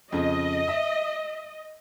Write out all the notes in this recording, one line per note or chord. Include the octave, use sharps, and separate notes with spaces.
F2 C#3 D#5
E5